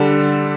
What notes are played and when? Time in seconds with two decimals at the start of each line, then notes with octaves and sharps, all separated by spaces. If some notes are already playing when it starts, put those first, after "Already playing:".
Already playing: D3 G3 D4 A4